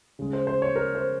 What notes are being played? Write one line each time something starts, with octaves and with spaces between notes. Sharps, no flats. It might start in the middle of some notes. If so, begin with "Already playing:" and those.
C#3 G#3
C5
C5
C#5
A#4
C5